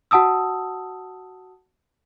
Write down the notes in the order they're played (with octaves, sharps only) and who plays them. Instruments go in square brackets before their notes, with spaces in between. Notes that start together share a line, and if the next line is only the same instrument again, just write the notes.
[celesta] F#4 F#5 A5 D#6 E6